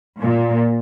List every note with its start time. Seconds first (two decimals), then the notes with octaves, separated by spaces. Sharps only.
0.21 A#2